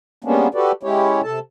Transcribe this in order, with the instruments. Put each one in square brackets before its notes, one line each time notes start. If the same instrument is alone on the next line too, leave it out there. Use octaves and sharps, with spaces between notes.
[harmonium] G3 G#3 A#3 B3 C#4 D4
F#4 G4 A4 B4 D5
G#3 C#4 E4 G4 C#5
C3 A4 A5